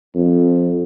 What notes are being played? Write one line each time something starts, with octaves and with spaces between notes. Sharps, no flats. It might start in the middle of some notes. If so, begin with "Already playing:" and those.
F2